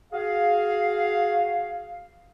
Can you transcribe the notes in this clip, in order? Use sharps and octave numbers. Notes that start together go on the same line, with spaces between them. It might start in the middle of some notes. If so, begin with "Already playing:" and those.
F#4 G#4 F5